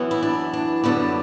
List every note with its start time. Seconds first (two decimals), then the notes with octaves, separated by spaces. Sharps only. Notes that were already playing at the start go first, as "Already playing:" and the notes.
Already playing: F#2 E3 B3
0.11 E4
0.23 D4
0.53 D4
0.84 F#2 D3 G3 B3 D4